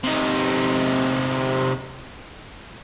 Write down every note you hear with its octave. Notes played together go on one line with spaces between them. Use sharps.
C3 D#4